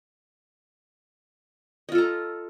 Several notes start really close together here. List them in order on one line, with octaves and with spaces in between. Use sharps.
D#5 F4 A4 A#5